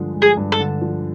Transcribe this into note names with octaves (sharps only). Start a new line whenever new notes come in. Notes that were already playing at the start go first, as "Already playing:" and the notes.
Already playing: G2 D3 F3 G#3
G#3
G#4
G2
A4
D3
F3